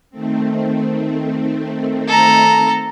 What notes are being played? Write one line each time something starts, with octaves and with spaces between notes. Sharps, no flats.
D#3 A3 C4
A4 A#5